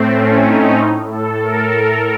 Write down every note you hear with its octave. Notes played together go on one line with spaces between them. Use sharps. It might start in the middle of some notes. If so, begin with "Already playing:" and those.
Already playing: A2 A3 C4
C#4
D#4
A2 D#4
A4
A#4